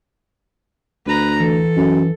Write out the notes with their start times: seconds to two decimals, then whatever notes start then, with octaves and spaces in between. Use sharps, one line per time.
1.06 D2 B4 A#5
1.40 E3 A4
1.77 F#2